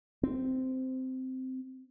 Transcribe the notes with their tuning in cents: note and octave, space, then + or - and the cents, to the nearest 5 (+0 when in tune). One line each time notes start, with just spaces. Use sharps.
C4 -10